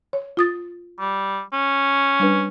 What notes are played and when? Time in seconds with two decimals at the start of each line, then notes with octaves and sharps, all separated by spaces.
0.13 C#5
0.37 F4 D#6 A6
1.00 G3
1.53 C#4
2.20 G3 D4 B4